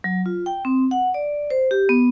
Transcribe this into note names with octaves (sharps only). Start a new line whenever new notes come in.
F#3
F4
G5
C4
F#5
D5
C5
G4
B3